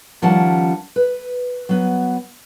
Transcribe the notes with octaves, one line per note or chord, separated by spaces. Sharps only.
D#3 F3 G3 C#4 F#5 A5
B4
F#3 B3